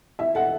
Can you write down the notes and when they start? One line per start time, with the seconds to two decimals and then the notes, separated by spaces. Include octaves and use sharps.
0.19 E4 E5
0.35 A4 F#5